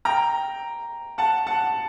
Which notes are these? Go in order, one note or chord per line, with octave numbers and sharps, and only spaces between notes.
G5 A#5
F#5 A5
F#5 A5